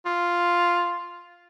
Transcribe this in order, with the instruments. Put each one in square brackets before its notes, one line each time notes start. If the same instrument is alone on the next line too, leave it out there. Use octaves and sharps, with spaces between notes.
[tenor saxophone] F4